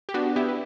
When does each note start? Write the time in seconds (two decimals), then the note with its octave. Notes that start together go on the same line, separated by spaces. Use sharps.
0.09 G4
0.14 B3 D4 F#4
0.36 B3 E4 G4
0.48 B4